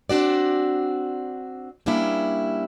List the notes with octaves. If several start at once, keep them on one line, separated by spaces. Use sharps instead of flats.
C4 D4 F#4 D5
G3 A#3 C#4 D4 E4